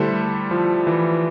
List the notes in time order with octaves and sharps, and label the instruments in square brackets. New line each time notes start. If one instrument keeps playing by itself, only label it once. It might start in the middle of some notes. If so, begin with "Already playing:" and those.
Already playing: [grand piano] D3 A3 E4 A4 C5 [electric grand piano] G3
[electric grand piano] F3
E3